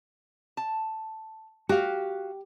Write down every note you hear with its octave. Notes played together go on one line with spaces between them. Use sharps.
A5
F#4 G4 F5